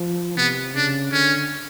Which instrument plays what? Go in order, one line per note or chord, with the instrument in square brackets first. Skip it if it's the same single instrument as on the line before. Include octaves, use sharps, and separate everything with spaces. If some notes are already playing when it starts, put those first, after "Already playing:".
Already playing: [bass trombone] F3
[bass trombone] C3 [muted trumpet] B3
[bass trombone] C#3 [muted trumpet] D4
[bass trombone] D3 [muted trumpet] C#4